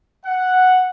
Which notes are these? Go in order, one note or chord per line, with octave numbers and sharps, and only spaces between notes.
F#5